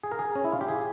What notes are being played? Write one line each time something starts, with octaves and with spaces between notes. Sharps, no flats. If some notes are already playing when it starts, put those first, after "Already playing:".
G#4
A#4
G#4
C#4
E4
F4
G4
G#4